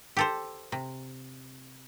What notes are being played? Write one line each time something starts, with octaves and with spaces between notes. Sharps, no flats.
G4 A4 C5
C3